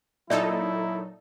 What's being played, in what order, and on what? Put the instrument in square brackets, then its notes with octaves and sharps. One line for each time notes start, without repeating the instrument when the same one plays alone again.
[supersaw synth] A#2 D#4 A4 [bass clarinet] F#3 [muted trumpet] E4 [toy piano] D5 E5